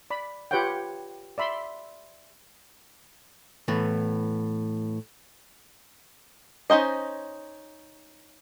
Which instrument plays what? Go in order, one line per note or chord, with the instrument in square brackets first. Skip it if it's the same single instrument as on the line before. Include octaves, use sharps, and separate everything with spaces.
[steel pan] D5 B5
F4 G4 B4 C#5 F#5 G5
D5 E5 B5 C6
[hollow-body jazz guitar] A2 E3 B3
[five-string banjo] C#4 D#4 C5 D#5